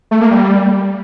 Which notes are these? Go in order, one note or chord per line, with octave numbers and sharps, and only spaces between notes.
A3
A#3
G3